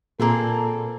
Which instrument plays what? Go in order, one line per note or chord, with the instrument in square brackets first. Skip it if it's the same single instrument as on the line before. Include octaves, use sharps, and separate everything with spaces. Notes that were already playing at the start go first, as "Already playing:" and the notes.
[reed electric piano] A#2 [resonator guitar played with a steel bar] A#3 C4 G#4 [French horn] A4